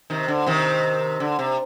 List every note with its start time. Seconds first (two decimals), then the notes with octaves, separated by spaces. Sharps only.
0.10 C3 D#3
0.28 D3
0.46 C3 D#3
1.20 D3
1.39 C3